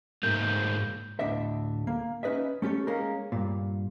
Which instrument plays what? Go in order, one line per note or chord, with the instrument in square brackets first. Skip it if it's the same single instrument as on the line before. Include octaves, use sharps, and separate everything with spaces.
[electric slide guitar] G#2 A3 A#3 [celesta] G6
[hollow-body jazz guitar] D2 A2 D3 D4 D#5 E5
A#3
C#4 D#4 B4 D#5 E5
A3 C#4 G4 A4 C#5
G#3 A#3 C#4 A#4
G2 A#2